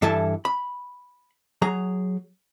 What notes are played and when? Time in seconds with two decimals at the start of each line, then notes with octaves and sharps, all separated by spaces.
0.02 G2 E3 E4 A4 E5 A5
0.45 B5
1.62 F#3 G#4 A#5